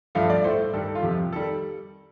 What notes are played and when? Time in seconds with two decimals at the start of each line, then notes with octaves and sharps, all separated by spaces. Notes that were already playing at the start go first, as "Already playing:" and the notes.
0.15 G2 F3 A3 F5
0.30 D5
0.44 A2 A3 C5
0.74 G2 D#3 G3 A4
0.95 F4
1.03 F2 C3 F3 G4
1.33 D#3 G3 A4